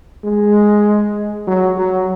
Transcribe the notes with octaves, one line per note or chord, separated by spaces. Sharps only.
G#3
F#3
F#3